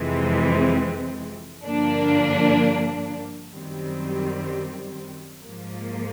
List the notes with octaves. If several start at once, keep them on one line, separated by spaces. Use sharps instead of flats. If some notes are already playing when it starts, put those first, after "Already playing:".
Already playing: F2 C3 E3 G#3 C4
G2 D3 F3 A#3 D4
F#2 D#3 G3 C4
G#2 F3 A#3